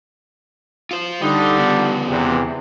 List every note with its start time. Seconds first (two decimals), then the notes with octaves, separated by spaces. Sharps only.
0.91 F4 C5
1.22 D3 G3 D#4
1.57 C#3 B3
2.08 E2 C3